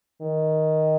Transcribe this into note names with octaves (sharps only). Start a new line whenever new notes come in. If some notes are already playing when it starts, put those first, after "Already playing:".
D#3